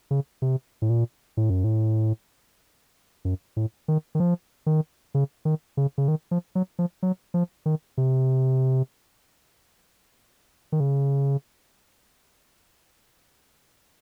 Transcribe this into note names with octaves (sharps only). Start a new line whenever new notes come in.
C#3
C3
A2
A#2
A2
F#2
A2
F#2
A2
D#3
D#3
F3
D#3
C#3
D#3
C#3
C#3
D#3
F3
F#3
F3
F#3
F3
D#3
C3
D#3
C#3